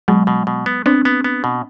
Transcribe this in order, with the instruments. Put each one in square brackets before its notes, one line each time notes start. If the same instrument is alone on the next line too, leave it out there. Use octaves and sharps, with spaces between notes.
[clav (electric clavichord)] B2 [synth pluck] F#3 G#3
[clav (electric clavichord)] B2
B2
B3
[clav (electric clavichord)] B3 [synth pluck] C4 D4
[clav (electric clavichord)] B3
B3
B2